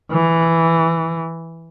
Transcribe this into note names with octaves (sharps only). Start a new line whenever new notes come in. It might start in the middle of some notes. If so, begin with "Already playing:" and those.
E3